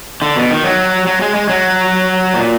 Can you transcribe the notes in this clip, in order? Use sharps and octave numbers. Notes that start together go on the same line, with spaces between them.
D3
B2
D#3
F#3
F#3
G#3
G#3
F#3
A#2